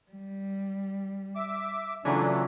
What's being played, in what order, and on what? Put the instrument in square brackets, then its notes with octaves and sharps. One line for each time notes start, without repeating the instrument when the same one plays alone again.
[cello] G3
[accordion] E5 D6
[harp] C#3 E3 [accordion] F#3 A3 D4 [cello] C#4 F4